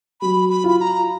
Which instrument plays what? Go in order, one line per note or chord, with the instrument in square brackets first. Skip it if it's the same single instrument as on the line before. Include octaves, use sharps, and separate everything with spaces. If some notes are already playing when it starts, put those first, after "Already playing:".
[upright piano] F#3 [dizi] B5
[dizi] B5
[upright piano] F4 [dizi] B5
[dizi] B5
A#5